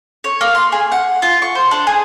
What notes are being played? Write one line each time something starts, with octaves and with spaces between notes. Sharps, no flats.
C#5
A#3
C6
G#4
F#5
F4
C#6
C5
D4
G#4